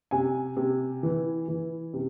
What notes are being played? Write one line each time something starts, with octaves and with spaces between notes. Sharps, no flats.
C3 G#5
C3
E3
E3
C3